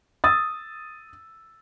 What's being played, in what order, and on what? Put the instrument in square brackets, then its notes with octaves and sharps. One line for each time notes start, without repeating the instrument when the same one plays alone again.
[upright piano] D#6 E6 A6